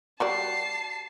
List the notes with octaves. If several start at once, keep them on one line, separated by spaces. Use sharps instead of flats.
G3 F#4 D5 A5 C7